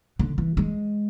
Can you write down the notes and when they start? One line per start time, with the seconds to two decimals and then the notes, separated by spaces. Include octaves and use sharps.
0.19 D3
0.38 E3
0.57 G#3